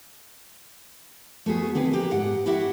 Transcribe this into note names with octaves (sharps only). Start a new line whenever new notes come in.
A3 B3 F#4 G#4
D3 C4 D#4 G#4 B4
A#3 G4 B4
G#2 F#5
E4 F#4 G4 E5 F#5